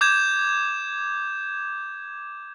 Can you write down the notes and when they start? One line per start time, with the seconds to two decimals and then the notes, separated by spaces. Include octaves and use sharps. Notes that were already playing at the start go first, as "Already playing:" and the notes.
0.01 D6 G6 G#6 E7